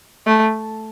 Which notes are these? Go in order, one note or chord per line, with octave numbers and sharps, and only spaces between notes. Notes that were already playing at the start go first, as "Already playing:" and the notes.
A3